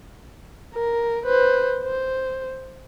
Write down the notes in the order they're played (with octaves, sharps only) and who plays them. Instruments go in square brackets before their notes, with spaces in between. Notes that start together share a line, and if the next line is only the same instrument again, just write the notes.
[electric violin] A#4
B4 C5
C5